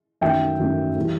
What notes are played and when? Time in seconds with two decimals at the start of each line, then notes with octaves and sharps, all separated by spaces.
0.21 F#2 D#3 F#3 A3 E5 G5
0.59 F#2 D#3 F#3 A3
0.96 A2 E3 G3